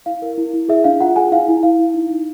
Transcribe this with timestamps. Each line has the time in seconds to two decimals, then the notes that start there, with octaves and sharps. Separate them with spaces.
0.06 E4 F5
0.22 A#4
0.38 E4
0.53 E4
0.69 G#4 E5
0.84 D4 F5
1.01 F4 F#5
1.16 G#4 G#5
1.32 E4 F5
1.48 E4
1.63 E4 F5
1.79 E4
1.94 D#4
2.11 D#4